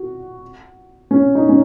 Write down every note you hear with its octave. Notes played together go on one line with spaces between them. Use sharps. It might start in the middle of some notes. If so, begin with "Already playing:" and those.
Already playing: F#4
C#4
D#4
C#4